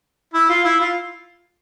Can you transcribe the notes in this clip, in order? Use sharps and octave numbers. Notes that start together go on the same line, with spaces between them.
E4
F4
E4
F4